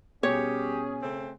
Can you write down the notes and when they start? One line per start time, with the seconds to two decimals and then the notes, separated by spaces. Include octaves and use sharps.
0.23 B2 G3 C#4 G4 G#4 C#5
1.01 C#3 A3 C4